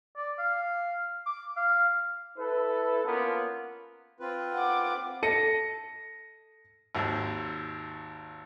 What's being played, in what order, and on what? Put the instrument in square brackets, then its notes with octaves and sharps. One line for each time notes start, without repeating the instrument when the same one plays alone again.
[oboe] D5
F5
D6
F5
[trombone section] E4 A4 B4
A#3 B3 C#4 F4 A#4
[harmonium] C4 F4 B4
[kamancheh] F#5 D6
[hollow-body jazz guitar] A4 [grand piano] A#6 C#7 D#7
[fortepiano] G#1 D#2